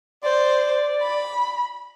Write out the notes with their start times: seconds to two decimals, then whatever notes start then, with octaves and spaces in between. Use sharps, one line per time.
0.24 C5 D5
1.02 B5